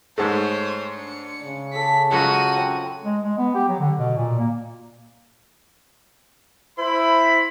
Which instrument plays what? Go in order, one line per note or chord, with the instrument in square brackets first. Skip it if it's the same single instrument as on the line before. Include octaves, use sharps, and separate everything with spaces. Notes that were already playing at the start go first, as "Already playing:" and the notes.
[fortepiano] G#2 G#3 A3 [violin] C5 C#5
[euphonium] D4 [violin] C#7
[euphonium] C#3
[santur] A4 A5 D6 [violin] B6
[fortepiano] F#2 G#3 [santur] F4 [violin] F#4 D#7
[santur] C4 C#4 F5
[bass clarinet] G#3
G#3
B3
G4
F#3
D3
B2
A#2
A#3
[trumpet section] E4 B5 [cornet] C5